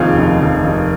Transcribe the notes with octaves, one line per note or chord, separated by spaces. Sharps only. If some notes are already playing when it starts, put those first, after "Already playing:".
Already playing: F1 D#2 D#3 C4 F4 G#4 F5
F1
F1
F1